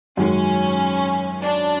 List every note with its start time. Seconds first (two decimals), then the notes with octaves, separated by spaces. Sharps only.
0.17 F#2 D#3 G#3 C#4
1.42 D4